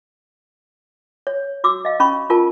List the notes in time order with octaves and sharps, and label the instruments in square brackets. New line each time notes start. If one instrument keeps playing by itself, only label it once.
[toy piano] C#5
F#4 D6 E6
D#5 F5
C#4 B5 C#6
F4 A#4 A5